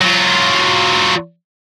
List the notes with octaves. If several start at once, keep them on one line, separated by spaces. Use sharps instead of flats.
F#3 F4